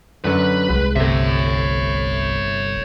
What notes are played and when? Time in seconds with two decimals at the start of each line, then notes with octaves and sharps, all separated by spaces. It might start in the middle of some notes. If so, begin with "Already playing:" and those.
0.24 F#2 D3 F#3 B4
0.70 C2 G#3
0.96 G1 C3 A3 C#5 E5